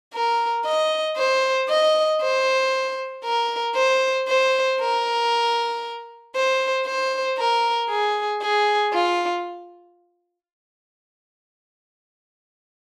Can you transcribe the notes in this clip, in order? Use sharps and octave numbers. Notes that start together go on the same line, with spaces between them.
A#4
D#5
C5
D#5
C5
A#4
C5
C5
A#4
C5
C5
A#4
G#4
G#4
F4